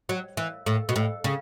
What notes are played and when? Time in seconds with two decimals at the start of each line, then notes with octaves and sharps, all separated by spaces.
0.09 F#3
0.37 E3
0.66 A2
0.89 B2
0.96 A2
1.24 C#3